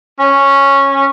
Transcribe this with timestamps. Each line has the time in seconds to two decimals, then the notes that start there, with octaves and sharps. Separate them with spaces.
0.19 C#4